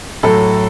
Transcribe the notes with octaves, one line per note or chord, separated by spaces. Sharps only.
A2 F#3 A4